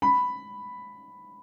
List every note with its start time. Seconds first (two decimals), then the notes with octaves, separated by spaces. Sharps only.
0.02 B5